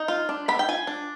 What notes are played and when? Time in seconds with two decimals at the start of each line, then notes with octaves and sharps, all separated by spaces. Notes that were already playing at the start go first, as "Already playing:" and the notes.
Already playing: D#4
0.08 F4
0.29 D4
0.48 B3 B5
0.59 G5
0.68 F4 G#5
0.87 D4